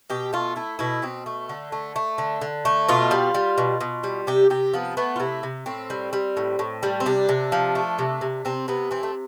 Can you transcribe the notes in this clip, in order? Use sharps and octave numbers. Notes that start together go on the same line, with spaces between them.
B2 G4
A3 F4
A3 E4
B2 E4
B2 C4
A3
D3
A3
A3
D3
D3
A3
B2 F4
G3
G3
B2
B2
G3
C3 G4
C3 G4
F3 B3
A3 B3
F4
C3 E4
C3
A2 C4
G3
G3
A2
A2
G3
C4
C3 D4
C3
F3
A3
C3
C3
C3 C4
C3 B3
E3 C4
A3